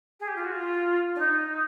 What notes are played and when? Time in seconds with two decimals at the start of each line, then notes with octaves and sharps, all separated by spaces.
0.20 G#4
0.28 G4
0.36 F4
0.44 F#4
0.52 F4
1.15 D4
1.19 D#4